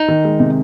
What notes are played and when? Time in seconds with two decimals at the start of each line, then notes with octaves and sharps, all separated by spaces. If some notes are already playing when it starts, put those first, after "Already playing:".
Already playing: D#4
0.08 D#3
0.25 G#3
0.40 C3